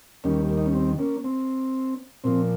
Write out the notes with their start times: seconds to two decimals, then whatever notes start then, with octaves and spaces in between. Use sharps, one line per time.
0.24 D#2 D#3 G3 A#3 C#4
0.49 A#3
0.58 D#4
0.66 C#4
0.74 C4
0.99 A#3 C#4
1.24 C4
2.24 A#2 F3 C4